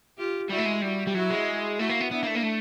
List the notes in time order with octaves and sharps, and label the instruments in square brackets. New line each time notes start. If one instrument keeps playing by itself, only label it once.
[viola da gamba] F4 G4
[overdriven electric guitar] G3 [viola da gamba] E4 F#4
[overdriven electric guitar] A3
G#3
[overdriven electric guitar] G3 [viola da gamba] E4 F#4
[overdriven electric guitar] G3
[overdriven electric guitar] F#3 [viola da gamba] E4 F#4
[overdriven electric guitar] G#3
[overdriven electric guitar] A3 [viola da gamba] E4 F#4
[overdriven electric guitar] A#3
B3
[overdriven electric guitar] B3 [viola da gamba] D4 E4
[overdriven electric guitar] A#3
A3
A#3
A3